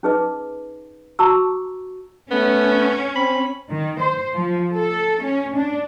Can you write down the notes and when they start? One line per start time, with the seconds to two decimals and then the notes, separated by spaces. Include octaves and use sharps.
0.03 C#4 D#4 G#4 B4 D#5 D6
1.19 F#4 A5 A#5 C#6 D6 E6
2.31 A3 B3 C#4
3.16 C4 B5
3.70 D#3
4.00 C5
4.34 F3
4.75 A4
5.23 C#4
5.57 D4